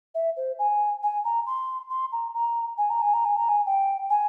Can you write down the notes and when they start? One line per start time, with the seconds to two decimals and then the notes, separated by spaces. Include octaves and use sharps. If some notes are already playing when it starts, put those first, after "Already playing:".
0.15 E5
0.37 C5
0.59 G#5
1.03 G#5
1.25 A#5
1.47 C6
1.90 C6
2.12 A#5
2.34 A#5
2.78 G#5
2.90 A#5
3.02 G#5
3.14 A#5
3.25 G#5
3.37 A#5
3.49 G#5
3.66 G5
4.10 G#5